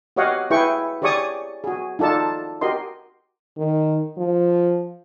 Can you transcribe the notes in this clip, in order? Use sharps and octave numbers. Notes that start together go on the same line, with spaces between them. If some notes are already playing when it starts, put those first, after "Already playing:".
F#4 G4 C#5 D#5 F5 F#5
E4 G#4 B4 G5 C#6
G4 G#4 C#5 D5 C#6 D#6
F#4 G#4
D#4 F4 A4 D5 A5
F#4 G4 A#4 D#5 C6
D#3
F3